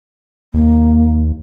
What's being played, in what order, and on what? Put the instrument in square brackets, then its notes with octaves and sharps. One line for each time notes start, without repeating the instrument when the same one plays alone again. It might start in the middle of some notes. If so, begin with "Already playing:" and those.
[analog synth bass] D#2 [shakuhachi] A#3